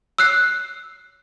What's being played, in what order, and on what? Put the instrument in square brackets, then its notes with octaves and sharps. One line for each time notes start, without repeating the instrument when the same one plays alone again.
[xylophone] E6 F#6 C7